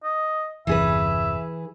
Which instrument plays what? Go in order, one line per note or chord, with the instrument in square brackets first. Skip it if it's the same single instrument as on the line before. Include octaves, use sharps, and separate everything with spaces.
[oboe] D#5
[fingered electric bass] G1 E2 C3 [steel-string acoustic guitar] E3 G#4 B4 [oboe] E5